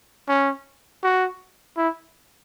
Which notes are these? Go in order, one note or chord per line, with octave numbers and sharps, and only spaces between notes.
C#4
F#4
E4